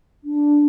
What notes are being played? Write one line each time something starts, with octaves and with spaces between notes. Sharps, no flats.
D4